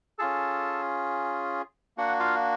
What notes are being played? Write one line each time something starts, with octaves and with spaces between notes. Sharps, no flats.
C#4 F4 G#4 A4 A5
A#3 D4 F#4 F#5
F4 F5